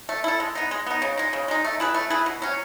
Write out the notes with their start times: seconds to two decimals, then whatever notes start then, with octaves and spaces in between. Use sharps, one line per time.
0.09 A3
0.24 E4 A4
0.40 G#3
0.55 B3 D#4
0.71 G#3
0.87 B3 D#4
1.02 C#3
1.18 G#3 D#4
1.33 C#3
1.48 G#3 D#4
1.64 A3
1.80 E4 G#4 B4
1.94 A3
2.10 E4 G#4 B4
2.26 B2
2.42 F#3 C#4